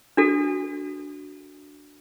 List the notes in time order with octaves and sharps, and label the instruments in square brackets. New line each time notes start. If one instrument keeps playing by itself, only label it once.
[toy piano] D4 F#4 A4